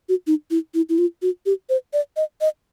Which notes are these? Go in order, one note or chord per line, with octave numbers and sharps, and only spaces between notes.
F#4
D#4
E4
E4
E4
F4
F#4
G4
C5
D5
D#5
D#5